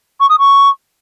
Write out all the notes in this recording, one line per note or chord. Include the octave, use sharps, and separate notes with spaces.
C#6
D#6
C#6